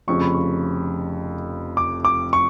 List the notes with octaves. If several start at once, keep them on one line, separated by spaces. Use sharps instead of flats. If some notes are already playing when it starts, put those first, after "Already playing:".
F1 F2 C#3 F3 C#6
B5
C#6
D6
D6
C#6